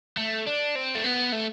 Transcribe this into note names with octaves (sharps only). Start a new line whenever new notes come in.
A3
D4
C4
A3
B3
A3